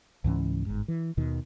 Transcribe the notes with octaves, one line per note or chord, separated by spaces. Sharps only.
C#2 G#2 E3 C#4
G1 G#2
E3
D#2 B2 D#3